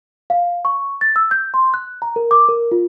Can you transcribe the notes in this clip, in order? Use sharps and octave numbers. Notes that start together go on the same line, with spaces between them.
F5
C#6
A6
E6
G6
C6
F#6
A#5
A#4
D6
A#4
F4